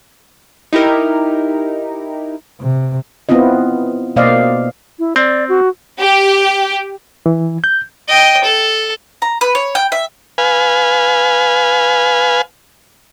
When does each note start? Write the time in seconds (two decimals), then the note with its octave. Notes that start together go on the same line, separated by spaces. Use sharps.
0.73 D#4 E4 G4 A#4
2.60 C3
3.29 B3 C4 E4 F4 D#5
4.16 B2 A#3 C5 D5 D#5 F5
4.99 E4
5.16 C4 D5
5.49 F#4
6.00 G4
7.26 E3
7.64 G6
8.09 D#5 G5
8.44 A4
9.22 A#5
9.41 B4
9.55 C#5
9.75 G5
9.92 E5
10.38 B4 F5 G#5